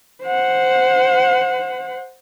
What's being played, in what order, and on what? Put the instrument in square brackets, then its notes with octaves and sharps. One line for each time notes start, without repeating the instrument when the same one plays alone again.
[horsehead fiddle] C5 F#5